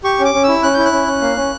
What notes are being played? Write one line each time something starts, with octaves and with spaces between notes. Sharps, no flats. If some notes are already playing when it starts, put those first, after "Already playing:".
G4 C#6
C#4
D6
C#4
E4 E6
C#4 F#6
E4 G6
F#6
C#4
C#4
A#3
C#4